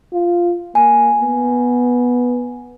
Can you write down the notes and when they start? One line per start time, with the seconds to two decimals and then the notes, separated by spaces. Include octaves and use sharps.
0.13 F4
0.75 A#3 G#5
1.22 B3